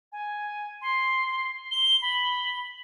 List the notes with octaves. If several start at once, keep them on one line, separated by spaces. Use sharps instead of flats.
G#5
C6
G7
B5